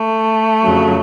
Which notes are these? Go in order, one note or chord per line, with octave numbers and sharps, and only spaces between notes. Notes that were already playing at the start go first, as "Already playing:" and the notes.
Already playing: A3
F2 C#3 F#3